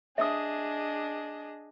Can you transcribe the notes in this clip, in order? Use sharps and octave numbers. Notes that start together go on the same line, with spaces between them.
D4 G#4 D#5 E5 D#6